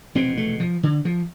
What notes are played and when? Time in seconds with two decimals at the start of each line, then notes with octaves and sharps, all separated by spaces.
0.15 F1 E2 B2 C4
0.37 A3
0.60 F3
0.83 D3
1.05 F3